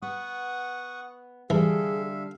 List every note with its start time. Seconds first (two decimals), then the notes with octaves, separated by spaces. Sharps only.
0.02 B3 F#5 C#6 D#6
1.50 D3 E3 G3 G#4 A4 E5 F5